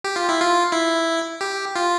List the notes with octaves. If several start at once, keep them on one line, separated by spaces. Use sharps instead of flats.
G4
F4
E4
F4
E4
G4
F4